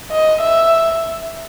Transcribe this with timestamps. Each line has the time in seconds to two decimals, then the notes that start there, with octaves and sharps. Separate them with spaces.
0.11 D#5
0.41 E5